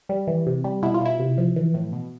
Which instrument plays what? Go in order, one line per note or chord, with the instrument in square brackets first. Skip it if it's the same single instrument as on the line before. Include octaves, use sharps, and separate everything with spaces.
[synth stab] G3
E3
C3
G3
B2 E4
F4
B2 E4
C3
F3
E3
A2
B2